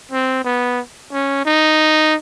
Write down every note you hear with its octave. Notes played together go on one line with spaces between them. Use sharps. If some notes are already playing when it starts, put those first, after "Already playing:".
C4
B3
C#4
D#4